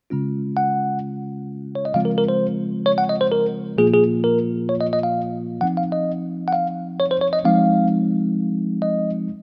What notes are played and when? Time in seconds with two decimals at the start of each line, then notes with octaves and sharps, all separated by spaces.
0.10 C#3 G#3 C#4 F4
0.57 F#5
1.75 C#5
1.85 D#5
1.94 C#3 F3 G#3 C4 F4 F5
2.05 A#4
2.18 A#4
2.29 C5
2.86 C#5
2.98 F#5
3.09 D#5
3.21 C5
3.32 A#4
3.78 A#2 F3 A#3 F4 G#4
3.94 G#4
4.24 A#4
4.69 C#5
4.80 D#5
4.93 D#5
5.03 F5
5.61 F3 C4 D#4 F#5
5.77 F5
5.92 D#5
6.48 F#5
6.52 F5
7.00 C#5
7.11 C5
7.21 C#5
7.33 D#5
7.45 F3 G#3 C4 D#4 F5
8.82 D#5